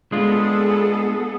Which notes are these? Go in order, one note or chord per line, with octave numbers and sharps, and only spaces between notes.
G#3 B3 D4 F4 G#4 A4